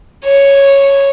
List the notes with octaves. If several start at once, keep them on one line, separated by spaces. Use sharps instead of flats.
C#5